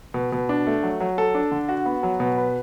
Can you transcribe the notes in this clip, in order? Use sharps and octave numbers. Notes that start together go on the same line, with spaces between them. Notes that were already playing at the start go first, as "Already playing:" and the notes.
B2
B2
D4
A3
F#3
F#3
A4
D4
D3
F#4
B3
F#3
B2
B4